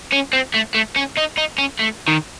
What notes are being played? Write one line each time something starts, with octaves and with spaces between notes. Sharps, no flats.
C#4
C4
A3
A3
C#4
D#4
D#4
C#4
A3
D#3